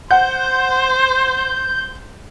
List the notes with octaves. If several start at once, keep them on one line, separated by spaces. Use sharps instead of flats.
C5 F#5 G6